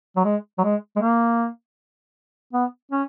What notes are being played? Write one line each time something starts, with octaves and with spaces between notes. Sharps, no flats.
F#3
G#3
F#3
G#3
G#3
A#3
B3
C#4